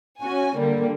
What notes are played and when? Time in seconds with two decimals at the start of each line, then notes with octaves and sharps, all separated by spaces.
0.20 C#4 F#4 G#5
0.59 D3 G3 A#3